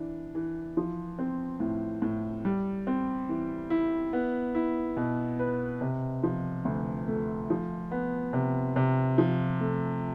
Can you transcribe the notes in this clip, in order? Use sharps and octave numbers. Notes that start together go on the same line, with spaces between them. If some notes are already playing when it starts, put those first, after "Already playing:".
Already playing: E3 D4
E3
F3
C4
A2
A2
G3
C4
E3
E4
B3
E4
B2
B4
C3
F3
D2
A3
F3
B3
C3
C3
F3
A3